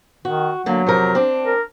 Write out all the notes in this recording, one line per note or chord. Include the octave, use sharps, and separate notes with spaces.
D#3 F#4
D3 F#3 A#3
F2 C3 A#4
C4 D4
A#4